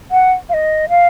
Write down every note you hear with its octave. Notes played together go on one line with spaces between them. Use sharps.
F#5
F5
D#5
F5